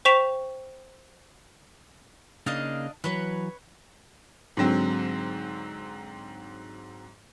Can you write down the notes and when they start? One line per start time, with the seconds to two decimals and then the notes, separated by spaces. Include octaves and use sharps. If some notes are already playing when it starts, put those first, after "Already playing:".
0.05 C5 G5 C#6 B6 E7 F7
2.46 C#3 A#3 D4 D#4 D#5 F5
3.04 E3 F#3 B4 C#5
4.57 G#2 D3 F#3 C4